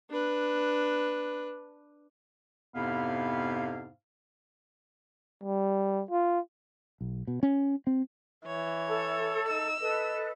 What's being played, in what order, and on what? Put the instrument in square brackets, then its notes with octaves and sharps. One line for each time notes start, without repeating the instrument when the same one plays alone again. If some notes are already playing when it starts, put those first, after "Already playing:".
[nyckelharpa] D4 B4
[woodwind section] F2 G#2 C3 B3 E4 F5
[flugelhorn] G3
F4
[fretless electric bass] B1
B2
C#4
C4
[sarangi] E3 [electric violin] C#5
[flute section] A4 A5
[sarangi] D#4 [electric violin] E6
[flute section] A4 B4 [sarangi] D#5